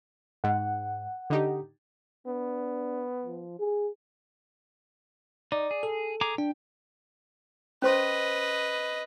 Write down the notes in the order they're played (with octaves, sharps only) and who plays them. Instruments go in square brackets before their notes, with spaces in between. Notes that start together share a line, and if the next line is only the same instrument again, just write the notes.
[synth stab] G#2 [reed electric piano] F#5
[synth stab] D3 D#4 G4
[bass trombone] B3 [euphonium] D4
[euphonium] F3
G#4
[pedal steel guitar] D#4 [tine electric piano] D5
[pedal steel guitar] G#4
[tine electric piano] A4
[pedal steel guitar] G#4 A#5 D6
[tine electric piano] D4 [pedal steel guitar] G5
[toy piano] C#4 C5 C6 [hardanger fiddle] B4 D#5